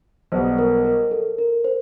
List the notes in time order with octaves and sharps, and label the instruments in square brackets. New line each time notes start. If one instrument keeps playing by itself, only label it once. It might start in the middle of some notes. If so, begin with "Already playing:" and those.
[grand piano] B1 B2 G3 B3 [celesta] C5
[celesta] A#4
A#4
A4
A#4
C5